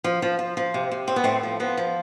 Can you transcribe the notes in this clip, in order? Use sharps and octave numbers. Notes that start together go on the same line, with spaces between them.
F3
F3
F3
F3
C3
C3
A2 C4
B3
A2 A3 C4
F3
F3 B3
F3